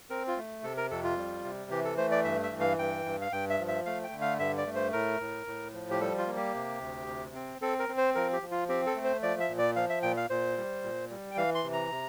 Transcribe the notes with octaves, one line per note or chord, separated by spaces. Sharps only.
C4 A#4
F4
A3
C3 A4
A#4
F2 A4
F4
G3
C3
E3 G4
A4
A3 C5
D5
G2 E5
E5
E3
F5
G2 G5
G2
F5
G2 G5
E5
F3
E5
A3 F5
G5
D3
F5
G2 E5
D5
A3
C5
A2 A#4
A2
A2
F3
G4
G3 A4
F4
A#3
G4
C3
D2
C3
C4
C4 A4
A#4
C4
C5
F3 A#4
G4
F3
F4
C4 G4
A4
A3
C5
F3 D5
E5
A#2
D5
F3 F5
E5
A#2 G5
F5
A#2 C5
G3
A#2
G3
G5
E3 F5
C6
C3
A#5
C3